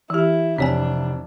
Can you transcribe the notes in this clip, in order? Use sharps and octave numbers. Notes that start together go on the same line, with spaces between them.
E3 E4 G4
F1 F2 C4 D4 C#5 G#5